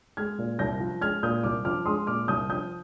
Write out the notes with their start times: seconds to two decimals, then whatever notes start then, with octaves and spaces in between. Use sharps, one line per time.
0.17 G#3 F6 G#6
0.38 A#2
0.59 C2 G6 A#6
0.80 F3
1.02 G#3 F6 G#6
1.23 A#2 D#6 G6
1.43 C2 D6 F6
1.65 F3 D6 F6
1.86 G#3 C6 D#6
2.07 A#2 D6 F6
2.28 C2 D#6 G6
2.49 F3 D#6 G6